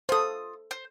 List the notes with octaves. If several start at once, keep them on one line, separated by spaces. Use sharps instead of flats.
F4 A4 C5 D#6
C5